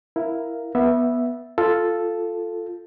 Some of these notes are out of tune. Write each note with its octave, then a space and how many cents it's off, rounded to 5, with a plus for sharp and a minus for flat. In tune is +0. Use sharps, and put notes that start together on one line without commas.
E4 +0 A#4 +0 F5 +0
B3 -15 E5 +0
F4 +0 A4 +0